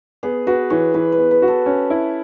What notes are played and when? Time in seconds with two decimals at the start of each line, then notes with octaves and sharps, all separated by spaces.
0.23 B3 G#4
0.47 F#4 B4
0.70 E3 C#5
0.94 E3 B4
1.12 B4
1.18 B3
1.31 B4
1.42 F#4
1.48 A4
1.66 C#4
1.90 E4